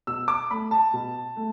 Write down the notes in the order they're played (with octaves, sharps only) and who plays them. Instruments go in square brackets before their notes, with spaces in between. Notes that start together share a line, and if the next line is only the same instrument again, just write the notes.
[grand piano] B2 E6
D6
A3 B5
A5
B2
A3